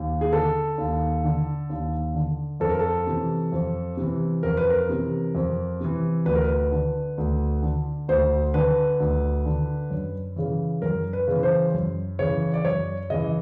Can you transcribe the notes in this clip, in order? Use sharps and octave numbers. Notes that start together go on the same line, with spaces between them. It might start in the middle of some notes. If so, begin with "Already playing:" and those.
Already playing: D#2
G#4
D3 A4
D#2
D3
D#2
D3
F2 A4
A#4
A4
C3 E3
F2
C3 E3
F2 A#4
B4
A#4
C3 E3
F2
C3 E3
D2 B4
A#4
B4
D3
D2
D3
D2 C5
D3 B4
D2
D3
F#2
C#3 E3
F#2 A#4
B4
C#3 E3
C5
F#2
C#3 E3 C#5
D5
F#2 C#5
C#3 E3 D#5